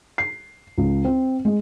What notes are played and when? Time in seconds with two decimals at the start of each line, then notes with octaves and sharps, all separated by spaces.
0.18 C7
0.78 C#2
1.05 C4
1.45 G#3